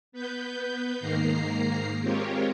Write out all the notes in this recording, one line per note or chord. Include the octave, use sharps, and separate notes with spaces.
B3 B4 G6
G#2 D#3 A#3 A#5 C7
G#3 C4 F4 G4 A#4 C#5